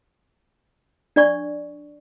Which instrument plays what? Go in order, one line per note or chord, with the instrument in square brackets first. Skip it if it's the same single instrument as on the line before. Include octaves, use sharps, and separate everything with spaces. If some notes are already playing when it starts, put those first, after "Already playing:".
[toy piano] D4 D5 C#6